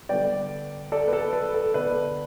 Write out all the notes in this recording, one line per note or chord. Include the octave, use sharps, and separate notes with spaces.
D3 G3 B3 D5 G5
A4 D5
B4
A4
B4
A4
D3 B3 D4 B4